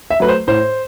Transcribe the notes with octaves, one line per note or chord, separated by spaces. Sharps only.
E5
F#3 A3 B4
C5
A2 C5